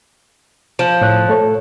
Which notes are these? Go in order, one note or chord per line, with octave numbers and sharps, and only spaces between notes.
F3
A2 C#5 F#6
A3 A4 C#5